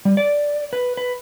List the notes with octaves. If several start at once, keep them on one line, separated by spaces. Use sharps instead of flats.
G3
D5
B4
B4